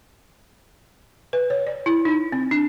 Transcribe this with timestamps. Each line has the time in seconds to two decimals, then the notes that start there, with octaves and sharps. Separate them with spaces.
1.33 B4
1.50 C#5
1.67 D5
1.86 E4
2.05 D#4
2.32 C4
2.51 D4